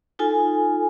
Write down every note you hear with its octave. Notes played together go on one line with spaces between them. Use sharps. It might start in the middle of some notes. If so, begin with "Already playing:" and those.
D#4 F4 A4 G#5